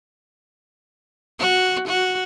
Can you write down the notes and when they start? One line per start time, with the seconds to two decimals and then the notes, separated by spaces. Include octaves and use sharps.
1.39 F#4
1.87 F#4